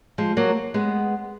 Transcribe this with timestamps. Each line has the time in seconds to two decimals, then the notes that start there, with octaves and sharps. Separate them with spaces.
0.18 F3 G#3
0.37 F#3 A#3
0.74 G#3 B3